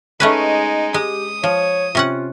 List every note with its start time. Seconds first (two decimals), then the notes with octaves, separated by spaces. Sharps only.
0.20 G#3 A3 C#4 D#4 B4
0.94 G#3 G4 D#6
1.43 F3 C#5
1.95 C3 C#4 F4 F#5